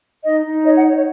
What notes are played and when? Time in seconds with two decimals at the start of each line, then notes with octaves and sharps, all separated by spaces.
0.24 D#4 D#5
0.45 D#4
0.65 C#5 D#5
0.76 F#5
0.87 C#5
0.97 C#5